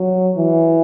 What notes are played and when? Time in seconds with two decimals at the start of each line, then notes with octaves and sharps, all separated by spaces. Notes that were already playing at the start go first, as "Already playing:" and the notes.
Already playing: F#3
0.37 E3